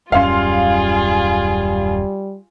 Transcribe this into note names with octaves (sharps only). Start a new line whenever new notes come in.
D#1 F#2 G3 C#4 F4 G#4 F5 C6